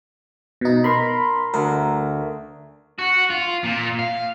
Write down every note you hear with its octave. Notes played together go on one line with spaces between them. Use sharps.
B2 D#4
A#4 B5 C6
D2 A#4
F#4
F4
A#2
F5